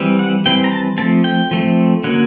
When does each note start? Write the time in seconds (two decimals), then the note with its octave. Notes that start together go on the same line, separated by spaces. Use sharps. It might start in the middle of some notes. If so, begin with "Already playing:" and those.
Already playing: E3 G3 C4
0.19 F#5
0.46 E3 G3 C4 G5
0.64 A#5
0.72 A5
0.98 F3 A3 C4 A5
1.24 G5
1.51 F3 A3 C4
2.04 D3 F#3 A#3 C#4 F#5